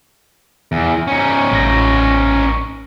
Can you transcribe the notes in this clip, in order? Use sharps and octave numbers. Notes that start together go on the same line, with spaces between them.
E2
C#4 D#4
A1 A#6